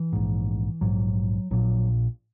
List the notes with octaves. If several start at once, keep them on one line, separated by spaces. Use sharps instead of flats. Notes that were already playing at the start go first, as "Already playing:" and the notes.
Already playing: E3
A#1 G#2
A#1 G#2 F#3
A#1 A#2 F#3